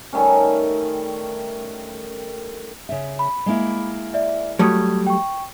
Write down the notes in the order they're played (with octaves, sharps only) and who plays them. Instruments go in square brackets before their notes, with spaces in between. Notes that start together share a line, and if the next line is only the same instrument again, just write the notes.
[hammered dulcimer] D#3 G3 A3 C#4
[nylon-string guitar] C#3 E5
[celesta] B5
[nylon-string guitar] G#3 A#3 E4
[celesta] D5 E5
[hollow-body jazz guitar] F#3 G3 A3 [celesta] A5 D#6 G#6
[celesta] G5 C#6